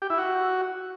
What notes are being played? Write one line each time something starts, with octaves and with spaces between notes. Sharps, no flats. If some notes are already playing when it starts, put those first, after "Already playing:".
G4
E4
F#4